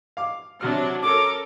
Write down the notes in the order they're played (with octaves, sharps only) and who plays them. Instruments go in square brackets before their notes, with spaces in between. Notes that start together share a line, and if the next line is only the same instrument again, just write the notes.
[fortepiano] F5 D6
[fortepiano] C3 F#4 F6 [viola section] F#3 D4
[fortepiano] C#4 [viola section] A4 A#4 [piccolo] D6